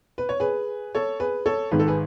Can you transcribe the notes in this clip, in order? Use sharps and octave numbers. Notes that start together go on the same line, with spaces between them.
B4
C#5
G#4 B4
A4 C#5
G#4 B4
A4 C#5
G#1 G#2 D#3 B4
A4
G#4 B4